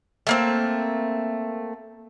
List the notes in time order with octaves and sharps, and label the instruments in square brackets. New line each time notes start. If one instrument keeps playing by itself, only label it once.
[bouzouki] A3 A#3 C4